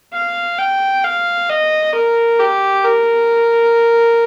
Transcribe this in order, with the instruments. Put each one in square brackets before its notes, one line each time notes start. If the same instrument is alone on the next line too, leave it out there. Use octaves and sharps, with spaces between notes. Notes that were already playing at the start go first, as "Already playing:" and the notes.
[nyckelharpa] F5
G5
F5
D#5
A#4
G4
A#4